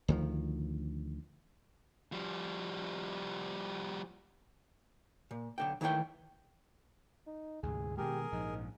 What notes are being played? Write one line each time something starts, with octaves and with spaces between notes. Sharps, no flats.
D2 D#3 F3
F3 G3
A#2
B1 D3 G5
D#3 E3 A3 C#5 G5
D#4
D2 G#2 C3 G#4
B2 D#3 G#3 G4 G#4 A#4
A#1 G#2 F3 D#4